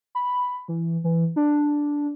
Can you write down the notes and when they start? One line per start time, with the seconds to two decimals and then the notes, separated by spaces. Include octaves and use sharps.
0.15 B5
0.68 E3
1.04 E3
1.36 D4